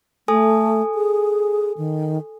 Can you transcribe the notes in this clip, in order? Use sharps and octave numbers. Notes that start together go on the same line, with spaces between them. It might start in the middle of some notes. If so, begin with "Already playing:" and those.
A3 A4 G#5 D#6
G#4
D#3